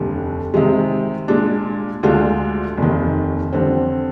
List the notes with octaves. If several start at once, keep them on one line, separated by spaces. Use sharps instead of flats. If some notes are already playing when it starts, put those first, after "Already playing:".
Already playing: F1 D#2 D3 G3
C3 D#3 G#3
A#2 G#3 D4
D2 D3 G#3 D4 F4
F1 D#2 D#3
F2 D3 G3 C4